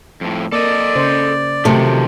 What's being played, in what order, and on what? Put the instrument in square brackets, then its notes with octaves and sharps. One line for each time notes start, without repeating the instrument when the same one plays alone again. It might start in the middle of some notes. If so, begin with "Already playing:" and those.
[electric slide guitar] F2 A2
[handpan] A#3 [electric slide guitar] A4 D#5 [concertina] D5
[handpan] C#3 C5
[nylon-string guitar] C3 A3 [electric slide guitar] D#3 F3 [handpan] F#3